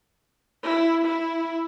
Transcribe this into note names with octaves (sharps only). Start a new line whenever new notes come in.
E4
E4